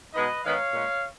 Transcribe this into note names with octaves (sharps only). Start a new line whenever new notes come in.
B2 G#3 B3 D#4 B4 D#5
D#3 G#3 B3 D#4 C#5 F5
A#2 G#3 C#4